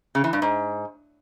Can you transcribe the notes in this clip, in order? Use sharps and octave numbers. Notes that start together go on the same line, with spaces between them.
C#3
E3
G2
G#2